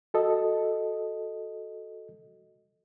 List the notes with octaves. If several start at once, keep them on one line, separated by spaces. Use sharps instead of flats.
F#4 A4 D#5